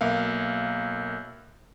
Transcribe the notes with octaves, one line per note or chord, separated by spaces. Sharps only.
B1 A#3 E5 F5